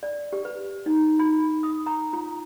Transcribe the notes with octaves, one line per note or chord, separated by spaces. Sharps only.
D5
G4
B4
D#4
B5
D#6
A#5
F4